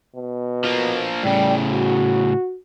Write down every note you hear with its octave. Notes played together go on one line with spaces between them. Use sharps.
B2
F3 A#3
A2 C#3 G3
F#4